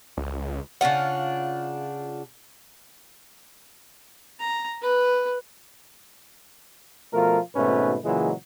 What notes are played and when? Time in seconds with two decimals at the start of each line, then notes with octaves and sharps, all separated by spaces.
0.17 C#2
0.81 C#3 D4 F4 F#5
4.40 A#5
4.82 B4
7.13 B2 F3 A3 F4 A#4
7.55 G#1 G#2 B2 A3 C#4 B4
8.04 A#2 C#3 E3 F#3 G#3